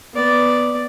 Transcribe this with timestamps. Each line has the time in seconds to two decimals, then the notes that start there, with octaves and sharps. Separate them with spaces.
0.14 B3 D5